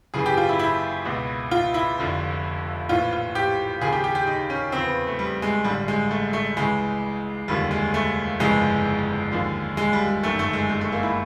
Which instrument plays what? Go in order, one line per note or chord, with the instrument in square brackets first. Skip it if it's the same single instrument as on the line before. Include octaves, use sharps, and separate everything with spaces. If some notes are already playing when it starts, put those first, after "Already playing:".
[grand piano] F#1 F#2 C#3 E3 G#4
G4
F4
E4
E4
C#2 B2
F4
E4
F1 F2 D3 F3
A#1 A2 E3 F4
F4
G4
D#2 C#3 F3 G#4
G4
G4
G4
D#4
C#4
E2 C#3 F3 C4
B3
A3
G3
G#3
A1 G2 D3 G3
G#3
A3
A3
C#2 C#3 E3 G#3
F1 D#2 D3 F3 G3
G#3
A3
G1 F2 C#3 E3 G#3
D#2 D3 F3
G#3
G3
G#3
G1 F#2 D#3 A3
A3
G#3
G#3
A3
A#3
E4